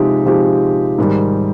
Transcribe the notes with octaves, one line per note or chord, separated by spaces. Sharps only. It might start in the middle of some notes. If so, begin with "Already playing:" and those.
Already playing: C3 F3 G#3 D#4 G4
C3 F3 G#3 D#4 G4
G#2 D#3 G3